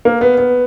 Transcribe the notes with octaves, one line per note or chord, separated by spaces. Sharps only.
A#3
B3
B3